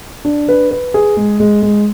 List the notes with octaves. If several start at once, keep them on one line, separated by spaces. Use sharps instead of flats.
D4
B4
B4
G#4
G#3
G#3
G#3